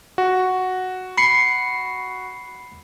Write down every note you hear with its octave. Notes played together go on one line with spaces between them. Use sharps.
F#4
B5 C7 C#7